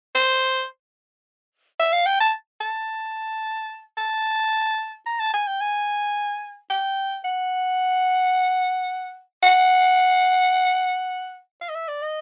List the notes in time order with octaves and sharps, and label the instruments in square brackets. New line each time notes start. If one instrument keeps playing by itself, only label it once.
[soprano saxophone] C5
E5
F5
G5
A5
A5
A5
A#5
A5
G#5
G5
G#5
G5
F#5
F#5
F5
D#5
E5
D5
D#5